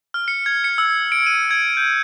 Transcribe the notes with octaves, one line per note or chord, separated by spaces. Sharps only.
F6
C#7
G#6
C#7
E6
D7
D#7
G#6
G6